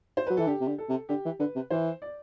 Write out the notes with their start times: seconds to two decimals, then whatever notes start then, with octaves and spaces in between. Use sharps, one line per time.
0.17 C5
0.27 F#3 B4
0.37 E3 A4
0.47 D3 G4
0.61 C3
0.68 D3
0.78 A4
0.89 C3
1.09 D3 G4
1.25 E3
1.40 D3 B4
1.55 C3
1.70 E3 C5
2.02 D5